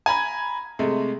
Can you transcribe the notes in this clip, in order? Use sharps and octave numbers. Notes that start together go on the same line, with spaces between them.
G#5 A#5 B5 G#6
C3 G#3 A3